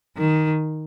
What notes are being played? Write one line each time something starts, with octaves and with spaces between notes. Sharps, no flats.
D#3